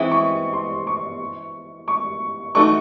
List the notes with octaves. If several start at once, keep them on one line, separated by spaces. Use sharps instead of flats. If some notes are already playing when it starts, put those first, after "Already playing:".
Already playing: E3 G#3 C4 E4 C#6
C#6
C6
C#6
C#6
E3 A3 D#4 F#4 C#6